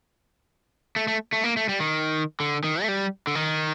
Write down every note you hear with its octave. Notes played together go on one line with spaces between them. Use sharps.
A3
A3
A3
A#3
A3
G3
D#3
D3
D#3
A3
G3
D3
D#3